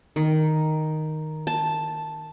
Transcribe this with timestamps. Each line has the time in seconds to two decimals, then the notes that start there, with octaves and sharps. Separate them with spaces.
0.16 D#3
1.47 A5